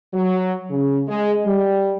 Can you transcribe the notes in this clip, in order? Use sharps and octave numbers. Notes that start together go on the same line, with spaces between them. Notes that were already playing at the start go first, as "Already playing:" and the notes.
F#3
C#3
G#3
G3